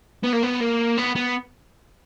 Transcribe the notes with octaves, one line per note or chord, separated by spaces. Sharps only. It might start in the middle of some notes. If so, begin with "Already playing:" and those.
B3
A#3
B3
A#3
B3
B3